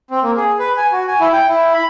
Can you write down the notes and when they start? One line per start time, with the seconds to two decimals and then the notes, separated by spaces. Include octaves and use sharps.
0.11 C4
0.23 A#3
0.37 G#4
0.59 B4
0.77 G#5
0.92 F#4
1.08 G#5
1.20 E4
1.33 G5
1.48 E4
1.74 B5